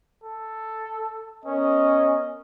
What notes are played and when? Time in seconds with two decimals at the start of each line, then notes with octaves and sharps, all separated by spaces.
0.24 A4
1.45 B3 C#4 A#4 D#5